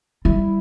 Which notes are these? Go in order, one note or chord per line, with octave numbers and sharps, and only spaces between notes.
G3 E4